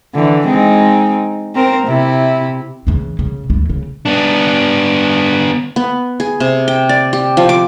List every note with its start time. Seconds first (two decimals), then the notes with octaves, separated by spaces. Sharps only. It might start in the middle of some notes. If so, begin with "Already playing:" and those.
0.15 D3 E3
0.47 G#3 C4 D#4
1.55 C4 A#4 C5
1.87 C3 E4
2.87 C#3 E3
3.19 C#3
3.50 D2 E3
3.70 C#3
4.05 B3 D4
5.76 B3
6.20 G#4
6.40 C3
6.68 G5
6.89 D5
7.13 G4
7.37 F3
7.49 D6